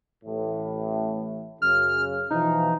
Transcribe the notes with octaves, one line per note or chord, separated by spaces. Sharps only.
A1 A2
F#2 C#3 F6
B2 E3 F3 D#4